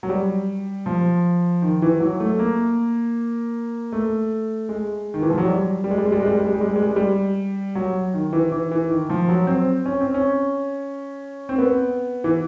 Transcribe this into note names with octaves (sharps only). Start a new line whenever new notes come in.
F#3
G3
F3
D#3
E3
F#3
A3
A#3
A3
G#3
D#3
E3
F3
F#3
G3
G3
G#3
G3
G#3
G3
G#3
G3
G#3
G3
G#3
G3
G#3
G3
G#3
G3
G#3
G3
F#3
D#3
E3
E3
E3
D#3
F3
F#3
C4
C#4
C4
C#4
C4
B3
E3